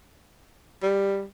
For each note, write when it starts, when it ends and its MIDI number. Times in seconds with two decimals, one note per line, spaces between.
0.82 1.24 55